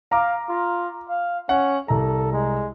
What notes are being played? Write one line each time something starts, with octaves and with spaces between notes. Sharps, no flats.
F5 A#5 D6
F4
F5
C#4 F#5
C2 A4 A#5
G#3